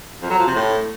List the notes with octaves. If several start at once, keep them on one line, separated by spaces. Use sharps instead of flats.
F2
F#3
F3
C3
A2